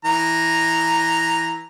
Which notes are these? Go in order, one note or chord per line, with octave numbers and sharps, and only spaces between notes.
E3 A#5